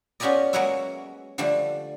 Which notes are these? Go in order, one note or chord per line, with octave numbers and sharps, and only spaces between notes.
B3 C#4 F4 G4 D5 D#5
F#3 G#3 A#3 G#4 B4 E5
D3 F3 G3 A3